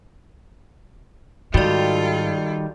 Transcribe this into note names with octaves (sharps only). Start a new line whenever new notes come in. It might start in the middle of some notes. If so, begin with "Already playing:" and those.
G#2 D#3 G3 F4 F#4 A4 D5